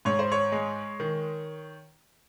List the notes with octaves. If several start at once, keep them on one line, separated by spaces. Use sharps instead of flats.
G#2 C#5
C5
C#5
G#3
D#3